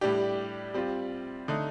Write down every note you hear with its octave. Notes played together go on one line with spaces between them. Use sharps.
A2 G3 D4 G4
G3 C4 F4
D3 A3 D#4